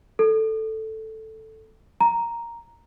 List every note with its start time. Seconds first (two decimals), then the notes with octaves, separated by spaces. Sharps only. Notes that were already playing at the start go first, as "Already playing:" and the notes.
0.19 A4
2.01 A#5